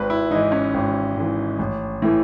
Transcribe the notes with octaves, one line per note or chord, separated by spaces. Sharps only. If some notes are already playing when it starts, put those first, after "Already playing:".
Already playing: G#1 B4
E4
G#2 E3 D#4
C#4
G#1
G#2 E3
A1
A2 E3